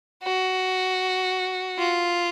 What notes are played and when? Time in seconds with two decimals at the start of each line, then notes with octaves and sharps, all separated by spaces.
0.23 F#4
1.79 F4